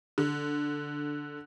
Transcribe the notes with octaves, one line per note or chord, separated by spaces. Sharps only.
D3